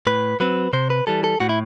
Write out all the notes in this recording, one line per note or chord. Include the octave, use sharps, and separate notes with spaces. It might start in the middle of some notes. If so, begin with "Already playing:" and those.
A2 B4
F#3 C4 B4
C3 C5
B4
E3 G3 A4
A4
A2 F#4
E4